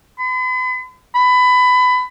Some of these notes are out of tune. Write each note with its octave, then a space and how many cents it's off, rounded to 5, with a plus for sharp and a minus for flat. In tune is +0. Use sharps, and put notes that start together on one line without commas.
B5 +45
B5 +20